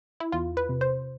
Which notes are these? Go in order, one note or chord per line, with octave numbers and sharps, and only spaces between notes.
E4
E2 F4
B4
C3
C5